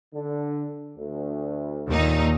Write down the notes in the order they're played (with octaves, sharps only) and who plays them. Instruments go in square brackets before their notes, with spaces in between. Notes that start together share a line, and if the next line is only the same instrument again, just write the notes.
[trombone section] D3
D2
[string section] D#2 A#2 D#4